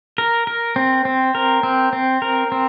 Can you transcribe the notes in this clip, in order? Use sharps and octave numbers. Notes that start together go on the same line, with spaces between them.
A#4
A#4
C4
C4
A#4
C4
C4
A#4
C4